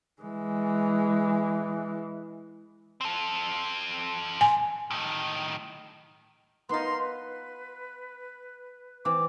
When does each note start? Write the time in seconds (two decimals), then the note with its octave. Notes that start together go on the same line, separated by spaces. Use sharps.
0.22 E3 G#3
3.01 C4 A4
4.41 G#5
4.91 A2 D#3
6.69 B3 D#4 F4 A#4 C6
6.97 B4
9.05 E3 C4 D6